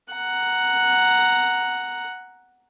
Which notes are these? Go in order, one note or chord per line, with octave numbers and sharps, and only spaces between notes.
F#5 A#5